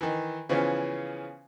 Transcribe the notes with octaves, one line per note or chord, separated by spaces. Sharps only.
D#3 E3
C#3 E3 F3 B3 C#4